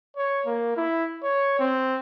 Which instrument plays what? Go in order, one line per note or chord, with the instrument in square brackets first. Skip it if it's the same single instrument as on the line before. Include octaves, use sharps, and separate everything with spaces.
[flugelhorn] C#5
A#3
E4
C#5
C4